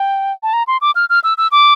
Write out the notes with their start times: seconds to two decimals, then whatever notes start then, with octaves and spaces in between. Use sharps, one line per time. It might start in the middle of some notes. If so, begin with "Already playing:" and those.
Already playing: G5
0.43 A5
0.53 A#5
0.67 C6
0.81 D6
0.95 F6
1.10 F6
1.24 E6
1.38 E6
1.52 D6